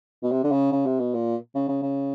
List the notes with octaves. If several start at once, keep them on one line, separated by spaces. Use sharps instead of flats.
B2
C3
D3
C#3
C#3
C3
B2
A#2
C#3
C#3
C#3